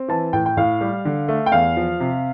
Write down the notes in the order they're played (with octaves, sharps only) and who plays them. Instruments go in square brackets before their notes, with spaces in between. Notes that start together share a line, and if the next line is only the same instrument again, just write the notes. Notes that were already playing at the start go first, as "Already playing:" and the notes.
Already playing: [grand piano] C4
[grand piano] E3 [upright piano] A5
[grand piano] A2 [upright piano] G5
[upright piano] G5
[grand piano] A2 [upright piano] F5
[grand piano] G3
D3
A3
[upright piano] G5
[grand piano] E2 [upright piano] F5
[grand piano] F3
C3